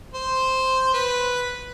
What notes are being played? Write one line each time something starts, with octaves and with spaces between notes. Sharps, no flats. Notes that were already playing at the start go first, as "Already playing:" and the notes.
C5
B4